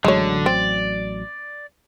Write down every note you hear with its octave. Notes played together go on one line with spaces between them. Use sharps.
A1 D3 F#3 G#3 C#5
C4 D5